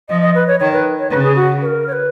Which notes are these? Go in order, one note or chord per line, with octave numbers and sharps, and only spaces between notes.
F3 D#5
D#5
B4
C#5
D#3 C#5
B4
C#5
C#3 B4
G#4
F#4
B4
A#4
C#5
B4